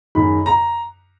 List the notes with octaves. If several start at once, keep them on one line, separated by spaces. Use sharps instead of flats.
F#2 D#3 G#3 B5
A#5